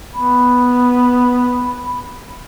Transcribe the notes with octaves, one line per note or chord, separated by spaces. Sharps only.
B3 B5